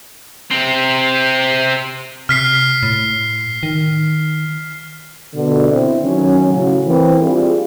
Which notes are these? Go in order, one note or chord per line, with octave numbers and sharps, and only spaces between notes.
C3 C4
C3 F6 B6 C7
A2
D#3
B2 D3
C4 E4
D#3 F#3 C#4
A2 C#3 F#3
E3 A#3 C4
G3 C4 D4 E4 F4 G#4